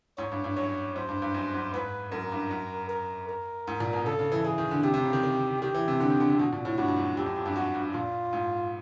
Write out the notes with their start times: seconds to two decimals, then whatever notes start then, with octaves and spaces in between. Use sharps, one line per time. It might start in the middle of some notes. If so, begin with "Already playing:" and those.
0.18 G#2 C#5
0.32 G2
0.44 G2
0.56 F#2 C#5
0.96 F#2 C5
1.09 G2
1.22 G2
1.34 F#2
1.54 F#2
1.74 G#2 B4
2.12 F#2 A#4
2.32 G2
2.51 F#2
2.89 A#4
3.29 A#4
3.68 G#2
3.80 A#2
3.93 B2
4.06 C#3 A4
4.19 C#3
4.32 E3
4.44 E3 G#4
4.58 D#3
4.71 D3
4.83 C3 G4
4.94 C3
5.03 C#3
5.13 D#3
5.23 D#3
5.62 D#3 G4
5.74 E3
5.88 C3
6.00 D3
6.10 D#3
6.20 D3
6.30 C3
6.39 B2 F#4
6.53 A#2
6.65 A2
6.77 G2 F#4
6.88 G2
6.97 F#2
7.17 F2 G4
7.26 F#2
7.36 F2
7.46 G2
7.55 F#2 F#4
7.75 G2
7.94 A#2 F4
8.33 G#2